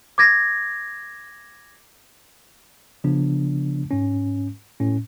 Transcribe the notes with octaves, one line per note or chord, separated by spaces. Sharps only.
D6 G#6 A#6
C#3 F3 B3 D4
G#2 C#4
A2 C#4